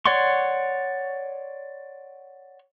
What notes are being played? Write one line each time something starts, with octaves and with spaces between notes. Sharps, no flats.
C#5 D5 F#5 C6 C#6